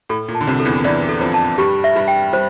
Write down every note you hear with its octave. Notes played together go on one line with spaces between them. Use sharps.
A2 A4
A#2
A5
D3
C2 C3
A4
E2 E3
E2 E3 D5
A4
F2 F3
A5
G2 G3 G4
E5
G2 G3
G5
G3 C5